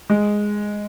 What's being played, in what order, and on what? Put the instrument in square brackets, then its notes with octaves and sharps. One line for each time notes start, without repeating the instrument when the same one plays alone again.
[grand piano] G#3